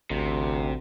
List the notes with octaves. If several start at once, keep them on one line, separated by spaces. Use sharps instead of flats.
A1 D2 C3